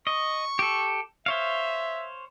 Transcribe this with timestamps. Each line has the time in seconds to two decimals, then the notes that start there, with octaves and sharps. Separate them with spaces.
0.07 D#5 C#6
0.59 G4 A4
1.26 C5 C#5 E5 F5